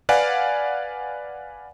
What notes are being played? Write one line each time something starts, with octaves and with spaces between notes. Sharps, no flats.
B4 D5 F5 F#5 G#5